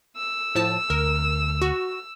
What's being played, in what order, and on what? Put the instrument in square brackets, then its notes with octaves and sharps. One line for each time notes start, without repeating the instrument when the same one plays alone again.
[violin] E6
[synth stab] A2 F3 A5
[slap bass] D2 [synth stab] A#4
[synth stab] F#4